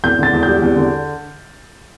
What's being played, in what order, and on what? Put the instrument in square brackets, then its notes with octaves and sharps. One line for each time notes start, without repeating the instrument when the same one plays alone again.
[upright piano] E2 G6
D3 A6
E2
G3 G6
E2
D3